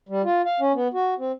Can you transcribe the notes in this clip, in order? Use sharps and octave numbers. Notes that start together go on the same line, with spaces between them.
G3
F4
F5
C#4
B3
F#4
C4